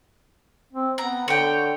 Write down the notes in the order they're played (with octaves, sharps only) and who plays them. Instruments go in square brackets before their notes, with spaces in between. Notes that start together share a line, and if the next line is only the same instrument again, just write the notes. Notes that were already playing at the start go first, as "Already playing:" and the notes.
[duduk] C4
[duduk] B3 [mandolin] A#5
[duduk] D3 [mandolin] C#5 G5